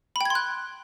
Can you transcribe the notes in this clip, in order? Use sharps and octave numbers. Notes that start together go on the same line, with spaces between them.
G5 B5 C6 F#6 G#6